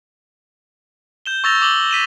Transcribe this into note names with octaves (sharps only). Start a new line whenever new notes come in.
G6 E7 G7
C#6 E6 A6 A#6 F7 G7
D6 F#7 G7
F#7
B6 D#7 E7 G7